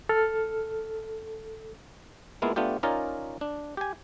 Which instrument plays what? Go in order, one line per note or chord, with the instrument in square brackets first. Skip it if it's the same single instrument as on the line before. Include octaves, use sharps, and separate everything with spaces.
[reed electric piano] A4 F6
[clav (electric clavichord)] G#3 A#3 B3 E4 F4
A3 B3 D4 F4 G4
C#4 D#4 F4 A#4 C#5 D5
D4
G4 G#5